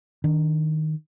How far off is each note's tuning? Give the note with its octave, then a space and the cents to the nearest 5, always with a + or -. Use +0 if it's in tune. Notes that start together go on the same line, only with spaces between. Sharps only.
D#3 +0 D4 +0